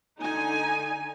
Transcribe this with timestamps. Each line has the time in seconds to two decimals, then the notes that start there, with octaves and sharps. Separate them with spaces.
0.18 D3 D#4 G#5